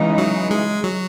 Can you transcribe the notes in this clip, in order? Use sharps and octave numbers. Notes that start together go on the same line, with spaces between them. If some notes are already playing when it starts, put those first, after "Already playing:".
Already playing: C#3 E3 G#3 D#4
F#3
G#3
F#3